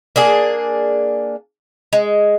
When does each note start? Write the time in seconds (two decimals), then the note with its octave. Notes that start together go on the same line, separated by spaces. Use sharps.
0.16 A#3 D4 G#4
1.93 G#3